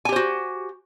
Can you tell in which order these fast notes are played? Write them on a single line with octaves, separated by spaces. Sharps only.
G#5 G4 C5 F#4